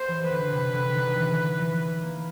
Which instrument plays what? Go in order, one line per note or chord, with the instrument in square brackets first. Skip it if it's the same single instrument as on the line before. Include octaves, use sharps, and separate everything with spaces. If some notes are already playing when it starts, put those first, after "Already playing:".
Already playing: [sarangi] C5
[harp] E3
[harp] D3 [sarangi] B4
[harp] C3
D3
D#3
E3
E3
A#3